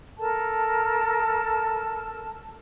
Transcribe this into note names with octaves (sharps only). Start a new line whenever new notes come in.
A4 A#4 A5